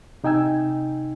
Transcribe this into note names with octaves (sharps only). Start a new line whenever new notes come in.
C3 D#4 G5 G#5 E6 G#6